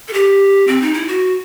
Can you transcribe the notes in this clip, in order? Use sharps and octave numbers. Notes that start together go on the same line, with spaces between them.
A4
G4
C4
D#4
E4
F#4